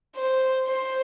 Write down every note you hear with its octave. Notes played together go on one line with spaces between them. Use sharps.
C5
C5